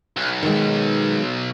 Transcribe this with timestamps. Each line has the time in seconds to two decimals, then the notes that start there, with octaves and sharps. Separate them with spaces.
0.16 B1
0.43 D#3 G#3